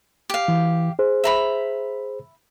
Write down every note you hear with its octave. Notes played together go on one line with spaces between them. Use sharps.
G4 F5
E3
G#4 C5
E5 A#5 B5